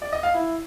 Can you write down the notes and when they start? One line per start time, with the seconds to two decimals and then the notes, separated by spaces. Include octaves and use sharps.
0.02 D5
0.12 D#5
0.23 F5
0.34 E4